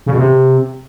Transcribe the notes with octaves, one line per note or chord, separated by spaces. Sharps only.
C#3
B2
C3